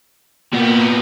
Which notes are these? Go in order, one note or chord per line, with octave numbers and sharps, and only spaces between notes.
A#2 A#3 B3 A#4 G5